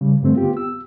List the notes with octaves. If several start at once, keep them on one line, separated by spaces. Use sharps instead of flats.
C#3 G3
G2 D3 A3 C4
B3 F4 G4
E6